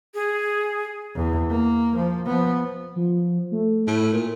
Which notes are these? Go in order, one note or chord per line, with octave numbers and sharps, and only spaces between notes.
G#4
E2
A#3
F3
F3 B3
F3
A3
A2
A#2